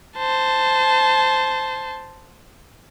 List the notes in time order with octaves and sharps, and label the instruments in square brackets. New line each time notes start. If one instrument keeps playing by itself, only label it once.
[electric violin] C5 A5